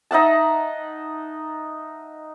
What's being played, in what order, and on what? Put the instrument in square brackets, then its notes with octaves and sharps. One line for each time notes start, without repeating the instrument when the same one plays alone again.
[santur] D#4 E5 F#5 A5